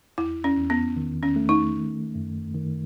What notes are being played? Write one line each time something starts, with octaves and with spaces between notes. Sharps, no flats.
E2 E4
C#4
E2
B3
D#3
C#4
A3
D#4
D#3
F#2
D#3